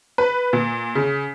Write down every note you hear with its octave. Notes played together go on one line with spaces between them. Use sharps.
B4
A#2
C#3